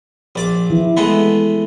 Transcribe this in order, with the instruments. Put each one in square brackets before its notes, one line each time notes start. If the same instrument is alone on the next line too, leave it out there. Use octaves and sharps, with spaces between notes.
[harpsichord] A#1 D5 D6
[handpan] E3 E4
[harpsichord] G#3 A3 B3